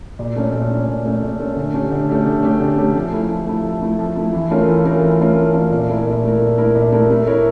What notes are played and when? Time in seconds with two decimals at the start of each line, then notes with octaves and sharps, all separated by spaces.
0.19 A#2
0.36 A3 C#4
0.53 A#2
0.71 A3 C#4
0.88 A#2
1.05 A3 C#4
1.22 A#2
1.40 A3 C#4
1.57 D3
1.74 A3 C#4 G4
1.92 D3
2.09 A3 C#4 G4
2.26 D3
2.43 A3 C#4 G4
2.60 D3
2.78 A3 C#4 G4
2.95 F3
3.13 A3 E4
3.30 F3
3.47 A3 E4
3.65 F3
3.81 A3 E4
3.99 F3
4.16 A3 E4
4.33 E3
4.51 A3 C#4 F4 A#4
4.68 E3
4.85 A3 C#4 F4 A#4
5.02 E3
5.20 A3 C#4 F4 A#4
5.37 E3
5.54 A3 C#4 F4 A#4
5.71 A#2
5.89 A3 E4 A#4
6.07 A#2
6.23 A3 E4 A#4
6.41 A#2
6.58 A3 E4 A#4
6.75 A#2
6.92 A3 E4 A#4
7.10 A3
7.27 E4 A#4 C#5